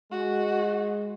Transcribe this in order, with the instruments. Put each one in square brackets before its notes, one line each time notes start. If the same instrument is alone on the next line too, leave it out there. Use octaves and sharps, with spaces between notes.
[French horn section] G#3 [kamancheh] F#4